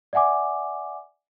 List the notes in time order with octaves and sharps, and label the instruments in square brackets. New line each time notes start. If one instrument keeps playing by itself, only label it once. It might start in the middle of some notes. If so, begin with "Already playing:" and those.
[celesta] D5 E5 F#5 G#5 D6